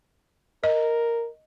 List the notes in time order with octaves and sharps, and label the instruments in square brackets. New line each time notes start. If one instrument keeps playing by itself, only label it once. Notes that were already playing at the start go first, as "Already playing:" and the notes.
[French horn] A#4 [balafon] D#5